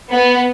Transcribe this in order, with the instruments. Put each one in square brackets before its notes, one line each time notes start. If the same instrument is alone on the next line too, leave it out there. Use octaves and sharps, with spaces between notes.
[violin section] B3